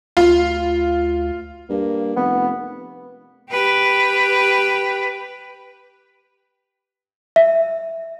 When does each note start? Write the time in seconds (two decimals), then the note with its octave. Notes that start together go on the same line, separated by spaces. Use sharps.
0.17 D2 F4
1.70 G2 A#3
2.16 F1 B3
3.50 G4 B4
7.36 E5